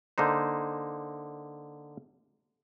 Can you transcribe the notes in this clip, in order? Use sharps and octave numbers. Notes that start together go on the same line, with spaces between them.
D3 A#3 D#4 C5